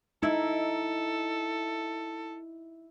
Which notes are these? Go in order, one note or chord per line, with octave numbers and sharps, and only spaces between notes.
D#4 E4 A4